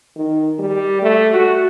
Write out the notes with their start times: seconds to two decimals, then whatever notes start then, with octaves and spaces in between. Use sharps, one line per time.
0.16 D#3
0.59 G3
1.02 A3
1.33 F#4